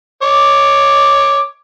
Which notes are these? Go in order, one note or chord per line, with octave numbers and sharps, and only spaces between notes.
C#5 D6